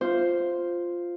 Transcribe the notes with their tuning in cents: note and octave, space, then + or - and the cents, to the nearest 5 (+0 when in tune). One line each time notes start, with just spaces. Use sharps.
F4 +0 C5 +0